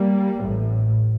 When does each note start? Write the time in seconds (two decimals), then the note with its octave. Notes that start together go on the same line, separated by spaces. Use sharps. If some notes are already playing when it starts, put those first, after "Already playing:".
Already playing: G3 A#3
0.42 A1 A2